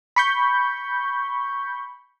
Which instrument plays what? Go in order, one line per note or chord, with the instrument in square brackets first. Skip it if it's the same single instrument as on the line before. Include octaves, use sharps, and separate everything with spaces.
[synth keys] B5 C#6 G6